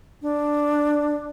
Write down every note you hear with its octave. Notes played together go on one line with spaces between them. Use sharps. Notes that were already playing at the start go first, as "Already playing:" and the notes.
D4